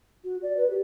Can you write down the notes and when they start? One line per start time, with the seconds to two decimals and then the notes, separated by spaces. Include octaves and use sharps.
0.24 F#4
0.43 D5
0.57 B4
0.70 G4